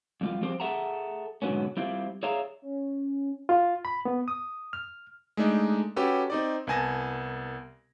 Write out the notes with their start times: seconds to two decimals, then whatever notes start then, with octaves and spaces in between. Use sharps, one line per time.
0.21 F2 G3 F4
0.41 F3 G3 C4 G4 C5
0.60 G#4 A4 E5 F#5 A5 A#5
1.42 G#2 B2 D3 F#3 B3 C#4
1.77 G3 C4 E4 F4
2.23 G#4 C#5 D5 E5 F5 A#5
2.62 C#4
3.49 F4
3.85 B5
4.05 B3
4.28 D#6
4.73 F6
5.37 G#3 A3 D4 D#4
5.96 C#4 F#4 G4 A4 B4
6.30 C4 D#4 D5
6.67 C2 B3 G#5 A5 A#6